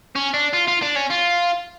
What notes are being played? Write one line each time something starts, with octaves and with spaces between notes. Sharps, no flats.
C#4
D4
F4
F4
D4
C#4
F4